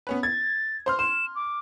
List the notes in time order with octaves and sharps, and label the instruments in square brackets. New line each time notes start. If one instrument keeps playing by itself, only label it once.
[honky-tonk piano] B3 C#4 B4
[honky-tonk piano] G#6 [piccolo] A6
[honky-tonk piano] C5 C6 F6
[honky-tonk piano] C6 [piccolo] E7
[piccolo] D6